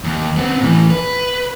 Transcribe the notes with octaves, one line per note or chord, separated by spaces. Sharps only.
D#2
B3 C4
A2 E3
B4